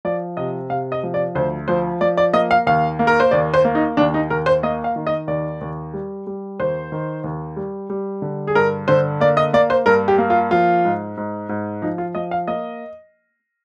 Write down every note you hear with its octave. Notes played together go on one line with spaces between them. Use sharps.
F3 D5
C3 D#5
C3 F5
D#5
F3
D5
D2 C5
F3 C5
F3 D5
D5
A#3 D#5
F5
D#2 F5
A#3
A#4
C5
D#2 D5
C5
A#3
D#4
D#2 D4
D#4
D#2 A#4
C5
A#3 D#5
F5
D#3
D#5
D#2 D5
D#2
G3
G3
D#2 C5
D#3
D#2
G3
G3
D3
G#4
G2 A#4
D3 C5
A#3 D5
D#5
A#3 D5
C5
G2 A#4
G4
A#3
F4
F3 F4
G#2
G#2
G#2
F3 D#4
F4
F3 D#5
F5
A#3 D#5